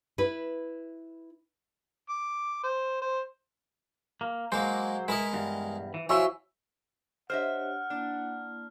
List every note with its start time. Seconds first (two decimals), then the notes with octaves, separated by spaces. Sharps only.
0.18 E4 B4
2.09 D6
2.63 C5
3.02 C5
4.21 A#3
4.52 F#3 G#3 A#3 C5
5.08 G#3 E4 A#4 B4 D#5
5.33 E2 G2
5.94 E3
6.09 F3 C#4 E4 F#4 E5 C6
7.30 D4 G4 C5 C#5 D#5 E5 F#5 F6
7.90 A#3 D4 E4